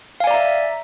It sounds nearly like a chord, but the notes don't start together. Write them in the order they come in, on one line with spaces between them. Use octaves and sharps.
F5 G#5 D5 A#5 E5